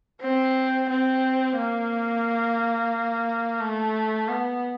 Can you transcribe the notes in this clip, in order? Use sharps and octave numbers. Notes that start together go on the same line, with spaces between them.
C4
C4
A#3
A3
B3